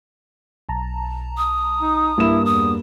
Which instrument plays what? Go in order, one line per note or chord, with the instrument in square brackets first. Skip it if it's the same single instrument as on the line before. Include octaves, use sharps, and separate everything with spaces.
[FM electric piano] B1 A5 A#5
[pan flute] D#6
[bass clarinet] D#4
[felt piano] G2 A#3 E7 [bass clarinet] E4
[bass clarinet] E2 [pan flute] D#6